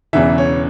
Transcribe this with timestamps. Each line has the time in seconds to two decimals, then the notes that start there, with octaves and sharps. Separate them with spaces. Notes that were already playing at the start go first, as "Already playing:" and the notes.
0.13 E1 E2 C#3 E3 E5
0.38 C#5